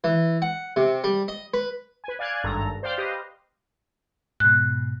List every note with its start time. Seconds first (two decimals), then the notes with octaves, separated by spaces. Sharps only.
0.04 E3
0.42 F#5
0.76 C3
1.04 G3
1.28 D#5
1.54 B4
2.04 B4 G#5
2.19 D5 F5 G#5 F#6 G#6
2.44 G#1 G2 A4 A#5
2.83 C5 D5 F5 G5 C6
2.97 G4 B4 C5 D#5 F5
4.40 G#2 B2 F#6